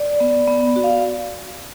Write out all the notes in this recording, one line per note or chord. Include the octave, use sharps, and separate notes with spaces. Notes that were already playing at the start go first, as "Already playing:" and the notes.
Already playing: D5
B3
B3
F#4
F5